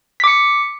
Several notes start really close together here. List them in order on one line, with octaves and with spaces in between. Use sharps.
B6 D6 C#7